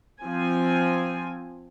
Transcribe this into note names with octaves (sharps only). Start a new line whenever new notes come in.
F3 C4 G#5